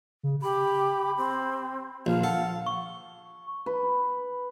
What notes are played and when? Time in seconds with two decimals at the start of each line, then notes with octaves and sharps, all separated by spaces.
0.23 C#3
0.42 G4 B5
1.17 C4
2.06 A#1 F3 F5
2.24 A4 F#5
2.66 C#6
3.66 B4